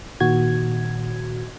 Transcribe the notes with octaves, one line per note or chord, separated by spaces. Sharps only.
A#2 D#3 F#4 G#6